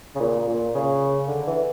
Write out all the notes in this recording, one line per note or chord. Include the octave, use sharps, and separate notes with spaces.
C#3
A#2
A#2
C#3
D3
E3